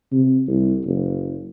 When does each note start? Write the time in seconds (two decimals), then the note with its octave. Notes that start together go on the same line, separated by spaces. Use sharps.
0.12 C3
0.48 C2
0.86 F#1